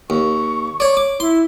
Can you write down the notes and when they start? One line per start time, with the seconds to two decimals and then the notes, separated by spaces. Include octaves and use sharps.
0.10 D#2 C#6
0.80 C#5 D5
0.97 D6
1.20 E4 C6